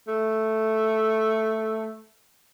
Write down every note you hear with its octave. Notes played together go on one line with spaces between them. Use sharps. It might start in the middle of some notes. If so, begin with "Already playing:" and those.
A3